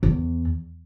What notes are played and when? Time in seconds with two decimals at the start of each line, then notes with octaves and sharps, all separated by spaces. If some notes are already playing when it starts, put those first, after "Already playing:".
0.03 E2